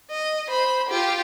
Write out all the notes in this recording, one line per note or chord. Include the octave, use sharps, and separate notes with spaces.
D#5
C5 B5
F4 G4